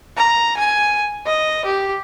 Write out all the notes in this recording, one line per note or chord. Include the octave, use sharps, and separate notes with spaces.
A#5
G#5
D#5
G4